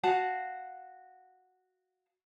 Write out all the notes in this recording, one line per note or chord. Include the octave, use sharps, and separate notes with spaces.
F#4 F5 F#5 A5